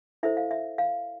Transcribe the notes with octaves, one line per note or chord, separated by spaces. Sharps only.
E4 A4 C5 E5
F5
E5
F5